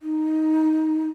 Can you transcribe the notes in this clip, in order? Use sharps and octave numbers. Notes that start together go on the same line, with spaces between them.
D#4